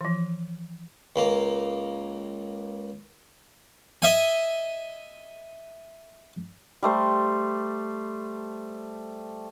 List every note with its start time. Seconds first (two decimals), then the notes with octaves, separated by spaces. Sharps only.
0.01 E3 F3
1.16 C#2 A#3
4.02 D#5 E5 G#5
6.83 G3 A3 C5